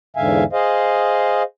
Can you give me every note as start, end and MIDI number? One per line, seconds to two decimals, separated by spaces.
0.16 0.44 40
0.16 0.44 44
0.16 0.44 50
0.16 0.44 76
0.16 0.44 77
0.16 0.44 80
0.53 1.43 68
0.53 1.43 72
0.53 1.43 75
0.53 1.43 77